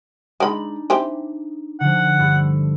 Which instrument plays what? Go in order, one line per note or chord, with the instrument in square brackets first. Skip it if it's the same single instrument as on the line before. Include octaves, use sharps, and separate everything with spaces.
[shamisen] G#3 B5 [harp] D4 D#4
[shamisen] E3 C4 G4
[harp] D3 F3 [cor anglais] F#5
[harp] G2 A4